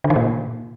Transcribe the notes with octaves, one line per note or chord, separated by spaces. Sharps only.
D3
D#3
A#2